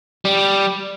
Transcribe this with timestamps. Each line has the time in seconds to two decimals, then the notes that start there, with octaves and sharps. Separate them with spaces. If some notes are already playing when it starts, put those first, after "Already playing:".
0.25 G3